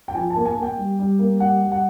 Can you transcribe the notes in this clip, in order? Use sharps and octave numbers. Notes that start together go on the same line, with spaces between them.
G5
F3 G#5
A5
A#3
G#5
A#3
G5
G3
G3
A#3
G3 F#5
G3
F#5